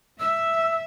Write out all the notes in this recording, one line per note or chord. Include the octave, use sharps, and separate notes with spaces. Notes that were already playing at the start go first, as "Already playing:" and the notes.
E5 E6